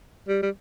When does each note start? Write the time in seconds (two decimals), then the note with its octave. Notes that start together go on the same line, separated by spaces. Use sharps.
0.28 G3
0.42 G3